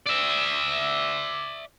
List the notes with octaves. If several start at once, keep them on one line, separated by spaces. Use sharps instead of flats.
D5 E5